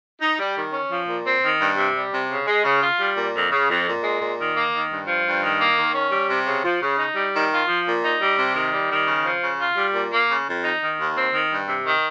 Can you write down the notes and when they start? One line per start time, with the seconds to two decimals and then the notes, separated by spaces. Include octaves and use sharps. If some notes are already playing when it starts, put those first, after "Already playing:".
0.21 D#4
0.39 G3
0.56 D#3
0.73 C#4
0.91 F3
1.07 A#2
1.26 C4
1.43 D#3
1.60 G2
1.77 C3
1.95 G3
2.12 C3
2.30 C#3
2.47 G#3
2.64 C#3
2.82 F4
2.99 G3
3.17 A#2
3.35 F2
3.51 C#3
3.69 F2
3.87 A#2
4.03 G#3
4.21 A#2
4.39 D#3
4.55 A#3
4.73 D#3
4.91 G2
5.07 F3
5.25 G2
5.43 D#3
5.61 A#3
5.78 D#3
5.94 C#4
6.12 G3
6.30 C3
6.47 C#3
6.64 F3
6.81 C#3
6.98 D#4
7.16 G3
7.34 D#3
7.52 F4
7.68 F3
7.86 A#2
8.03 D#4
8.21 G3
8.39 C3
8.55 D#3
8.73 G3
8.91 D#3
9.07 C#3
9.25 F3
9.42 C#3
9.59 F4
9.77 G3
9.94 A#2
10.11 A#3
10.29 C#3
10.47 F2
10.64 D#4
10.81 D#3
10.99 D#2
11.17 C4
11.34 D#3
11.51 G2
11.68 C3
11.86 D#3